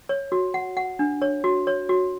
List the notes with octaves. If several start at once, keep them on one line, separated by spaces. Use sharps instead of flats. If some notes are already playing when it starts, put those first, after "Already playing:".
C#5
F#4
F#5
F#5
D4
C#5
F#4
C#5
F#4